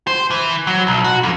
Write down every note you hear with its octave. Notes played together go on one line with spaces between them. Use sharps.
C5
E3
F#3
B1
F#4
F2